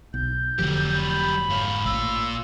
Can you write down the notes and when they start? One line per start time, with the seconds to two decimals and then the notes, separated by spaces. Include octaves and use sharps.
0.14 B1 G6
0.59 F1 D3 F3 F#3 G4
0.97 B5
1.49 G#2 C#5 F5
1.86 A1 A#2 F5 E6